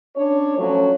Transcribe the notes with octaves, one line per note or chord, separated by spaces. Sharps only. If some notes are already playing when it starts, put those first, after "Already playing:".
C#4 D4 C#5
F3 F#3 A3 C#4